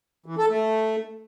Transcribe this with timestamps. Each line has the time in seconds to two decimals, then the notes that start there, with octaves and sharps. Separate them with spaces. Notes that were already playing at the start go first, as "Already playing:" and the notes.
0.26 E3
0.38 A4
0.50 A3